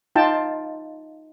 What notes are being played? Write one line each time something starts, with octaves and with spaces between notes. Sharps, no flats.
D#4 F4 G5 A5